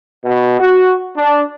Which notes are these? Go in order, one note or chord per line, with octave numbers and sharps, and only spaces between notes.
B2
F#4
D4